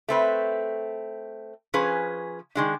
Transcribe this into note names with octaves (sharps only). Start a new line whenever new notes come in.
A3 C4 B4
F3 C#4 G#4 B4
D#3 G#3 D4